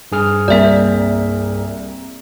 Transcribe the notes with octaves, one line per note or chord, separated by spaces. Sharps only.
G2 G#4 F6
C2 A#3 D5 E5 B6